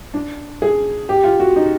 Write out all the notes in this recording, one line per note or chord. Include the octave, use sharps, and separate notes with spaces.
D4
G#4
G4
F4
F#4
D#4